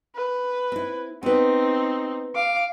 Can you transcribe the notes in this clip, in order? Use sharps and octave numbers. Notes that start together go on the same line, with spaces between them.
B4
C4 E4
B3 C4 D#4 B4
F5 D6